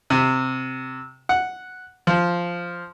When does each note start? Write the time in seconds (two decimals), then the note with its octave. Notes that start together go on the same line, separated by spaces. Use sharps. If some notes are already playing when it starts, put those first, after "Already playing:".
0.10 C3
1.29 F#5
2.07 F3